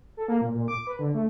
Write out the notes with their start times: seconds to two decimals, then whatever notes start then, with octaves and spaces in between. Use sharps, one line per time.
0.17 A4
0.28 A#3
0.41 A#2
0.54 A#2
0.68 D6
0.87 B4
0.99 D3
1.14 A3